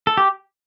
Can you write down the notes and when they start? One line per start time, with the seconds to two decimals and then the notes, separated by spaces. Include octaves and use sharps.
0.07 A4
0.17 G4